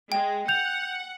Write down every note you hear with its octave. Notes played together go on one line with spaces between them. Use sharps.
G#3 G5
F#5 G6 F7